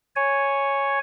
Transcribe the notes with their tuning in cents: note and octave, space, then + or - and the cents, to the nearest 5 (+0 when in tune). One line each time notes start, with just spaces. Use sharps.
C#5 +0 G#5 +0